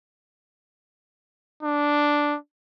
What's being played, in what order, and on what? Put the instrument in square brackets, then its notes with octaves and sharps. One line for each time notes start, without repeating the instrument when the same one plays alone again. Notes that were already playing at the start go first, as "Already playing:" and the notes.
[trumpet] D4